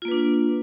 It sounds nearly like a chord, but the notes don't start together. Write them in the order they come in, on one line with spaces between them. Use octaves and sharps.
F4 A#3 B4 D4